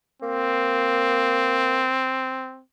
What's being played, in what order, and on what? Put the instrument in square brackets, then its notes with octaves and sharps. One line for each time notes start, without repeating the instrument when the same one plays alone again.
[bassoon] A#3 [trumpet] C4